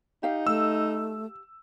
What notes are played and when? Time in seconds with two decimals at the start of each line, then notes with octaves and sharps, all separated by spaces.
0.23 D#4 G4 F5
0.47 A3 E6